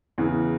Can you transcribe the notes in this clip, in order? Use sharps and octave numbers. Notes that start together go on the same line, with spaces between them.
E2 C#3 E3